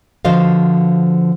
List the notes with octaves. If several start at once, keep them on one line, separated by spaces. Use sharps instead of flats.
D3 F3 F#4 C5 D#5 F5